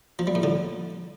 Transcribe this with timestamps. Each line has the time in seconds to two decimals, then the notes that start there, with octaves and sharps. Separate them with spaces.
0.19 F3
0.27 G3
0.35 A2
0.43 D3